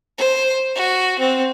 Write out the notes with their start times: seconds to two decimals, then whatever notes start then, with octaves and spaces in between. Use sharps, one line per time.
0.18 C5
0.76 F#4
1.19 C4